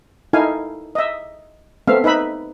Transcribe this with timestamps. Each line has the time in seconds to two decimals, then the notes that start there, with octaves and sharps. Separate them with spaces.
0.33 D#4 E4 A4 F5 G#5
0.95 D#5 E5
1.87 A3 B3 C4 E5 F5
2.04 D#4 B4 E5 B5